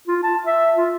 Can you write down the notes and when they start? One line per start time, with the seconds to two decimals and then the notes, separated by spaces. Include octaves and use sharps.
0.07 F4
0.23 A5
0.45 E5
0.76 F4